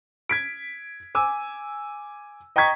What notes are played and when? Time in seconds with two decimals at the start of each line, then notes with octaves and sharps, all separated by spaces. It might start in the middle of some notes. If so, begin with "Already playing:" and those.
0.29 G#6 B6 D7
1.15 G#5 D6 E6
2.56 D#5 G5 A#5 C#6 G#6 B6